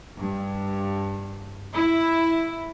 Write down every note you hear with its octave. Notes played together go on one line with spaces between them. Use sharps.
G2
E4